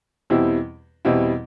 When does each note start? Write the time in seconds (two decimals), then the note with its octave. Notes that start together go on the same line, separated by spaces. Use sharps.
0.30 E2 B2 G3 C4 E4
1.05 E2 B2 G3 C4 E4